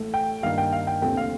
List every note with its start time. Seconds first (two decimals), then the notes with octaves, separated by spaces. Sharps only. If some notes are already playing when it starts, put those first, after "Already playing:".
Already playing: A1 A2 A3
0.14 G5
0.43 G2 D#3 A#3 F5
0.58 G5
0.72 F5
0.87 G5
1.02 F1 D#2 D3 A3 C4 G5
1.17 F5